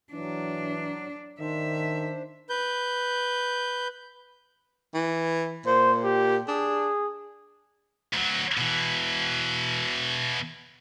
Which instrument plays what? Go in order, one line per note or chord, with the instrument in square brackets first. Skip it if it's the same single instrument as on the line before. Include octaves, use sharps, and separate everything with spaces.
[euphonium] E3 [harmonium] F#3 [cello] D4
[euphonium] D#3 [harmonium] D4 C5 [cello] E5
[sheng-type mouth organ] B4 G6
[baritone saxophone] E3
[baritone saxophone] A#2 [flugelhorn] C5
[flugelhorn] G4
[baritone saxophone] D4 [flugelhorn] G#4
[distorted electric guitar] D2 F#3
B2 E3